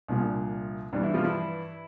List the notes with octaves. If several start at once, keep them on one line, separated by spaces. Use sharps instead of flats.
C2 A#2 F3 D4
G2 E3 D4
E4
F3 F4
E4